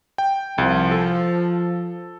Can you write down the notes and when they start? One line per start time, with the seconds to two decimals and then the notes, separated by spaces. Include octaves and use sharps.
0.18 G5
0.58 C2 F3
0.91 A4